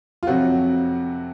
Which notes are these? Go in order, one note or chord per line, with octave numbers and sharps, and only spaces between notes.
F4
F2 C3 F#3 F#4